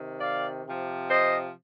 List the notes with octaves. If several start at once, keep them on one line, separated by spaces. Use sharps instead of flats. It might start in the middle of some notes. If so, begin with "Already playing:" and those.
Already playing: C3 D#3
D5 F5
C3 F3
C5 D#5